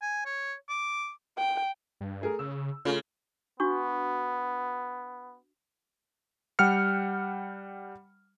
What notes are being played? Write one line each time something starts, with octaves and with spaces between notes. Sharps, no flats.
G#5
C#5
D6
G5
G2
A3 G#4 A#4
C#3 E6
C#3 A3 F4
B3 D4 F#4 C#6
G3 F#5 G5 F6 C#7